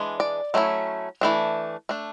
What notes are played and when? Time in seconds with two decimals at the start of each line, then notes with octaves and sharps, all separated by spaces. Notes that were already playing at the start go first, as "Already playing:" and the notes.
Already playing: E3 G#3 D4
0.20 D5
0.54 F#3 A3 C#4 E4
1.21 E3 A3 D4
1.89 A3 D4